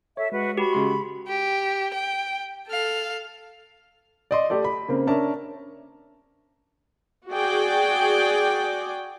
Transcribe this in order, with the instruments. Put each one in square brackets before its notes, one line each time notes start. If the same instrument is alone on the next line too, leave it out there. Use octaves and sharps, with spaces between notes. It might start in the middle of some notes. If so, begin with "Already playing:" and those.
[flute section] A4 E5 [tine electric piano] C#5
[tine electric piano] G#3 [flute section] F#4 B4
[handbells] F#4 G4 [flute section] B5
[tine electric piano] C#3 G#3 C6
[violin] G4
G5
A4 F5
[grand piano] D5 D#5 C6
A3 G4 A4 D5
B5
C#3 A#3 C4
C#4 D4 A#4 E5 A5
[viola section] F#4 G#4 D5 G5